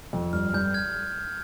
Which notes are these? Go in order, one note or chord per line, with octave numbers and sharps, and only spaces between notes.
F2
G2 F6
G2 G6
F6 G#6